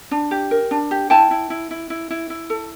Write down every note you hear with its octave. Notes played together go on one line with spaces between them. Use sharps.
D4
G4
A#4
D4
G4
E4 G5 A5
E4
E4
E4
E4
E4
E4
A4